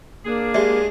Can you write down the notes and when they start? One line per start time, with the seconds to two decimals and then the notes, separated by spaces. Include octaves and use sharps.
0.25 A#3 D4 G#4
0.54 G#3 G4 D5 E5